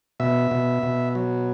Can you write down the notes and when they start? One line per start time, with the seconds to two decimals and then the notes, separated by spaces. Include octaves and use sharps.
0.20 B2 E5
0.51 B2
0.83 B2
1.15 F#3